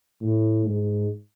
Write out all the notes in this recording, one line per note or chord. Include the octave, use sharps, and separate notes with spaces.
A2
G#2